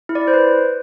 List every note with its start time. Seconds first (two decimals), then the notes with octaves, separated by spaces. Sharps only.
0.09 E4
0.15 D5
0.21 E4
0.28 C5
0.34 B4